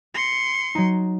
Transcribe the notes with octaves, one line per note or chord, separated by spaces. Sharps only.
C6 A#6 C#7
F#3 D#4